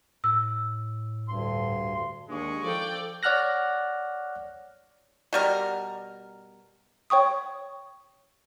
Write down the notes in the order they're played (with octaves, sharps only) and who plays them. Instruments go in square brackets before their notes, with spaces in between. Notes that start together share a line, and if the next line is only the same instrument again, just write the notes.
[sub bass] A2 [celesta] E6
[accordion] D2 G2 C6
[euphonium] D#2 [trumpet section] G#3 C#6 [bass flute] D4
[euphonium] F3 [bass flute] A4 [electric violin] D5 G5
[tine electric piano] C#5 D5 F#5 F6 F#6 A#6
[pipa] B2 G3 A#4
[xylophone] C#5 G5 C#6 D#6